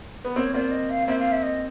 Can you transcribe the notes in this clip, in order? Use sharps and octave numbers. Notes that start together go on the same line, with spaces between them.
B3
A#3 C4 C#5
A#3 C4 D5
D#5
F5
A#3 C4 E5
F5
E5
D#5